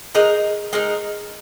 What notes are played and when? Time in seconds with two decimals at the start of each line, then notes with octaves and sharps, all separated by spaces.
0.15 G#3 D#4 A#4 D#5
0.73 G#3 D#4 A#4 D#5